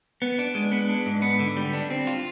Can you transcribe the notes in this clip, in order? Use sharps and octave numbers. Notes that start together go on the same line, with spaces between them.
B3
D4
G#3
B3
D4
G#2
B3
D3
G3
D4
C4
F4